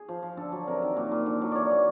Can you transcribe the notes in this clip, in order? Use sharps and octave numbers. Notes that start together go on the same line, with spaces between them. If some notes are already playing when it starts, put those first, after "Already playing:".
Already playing: G#4
F3
F3
D3 A4
F#3
C3 A#4
D#3
A#2
A#2
D3
F#3
E3 C#5 D5
E3